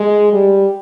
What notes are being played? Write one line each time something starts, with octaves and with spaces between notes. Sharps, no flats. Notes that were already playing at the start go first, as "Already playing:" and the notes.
Already playing: G#3
G3